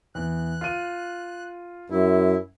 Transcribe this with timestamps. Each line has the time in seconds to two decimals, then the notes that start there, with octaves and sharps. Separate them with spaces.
0.15 E2 F#6
0.61 F4 D#7
1.91 F#2 E4